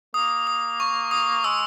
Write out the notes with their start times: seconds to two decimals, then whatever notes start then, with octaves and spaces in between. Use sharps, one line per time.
0.14 A#3 D#6
0.47 D#6
0.80 C#6
1.11 D#6
1.44 G#3 E6